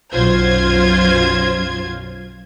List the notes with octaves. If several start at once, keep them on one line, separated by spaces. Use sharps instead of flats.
B1 F#2 F#3 F4 C5 G#6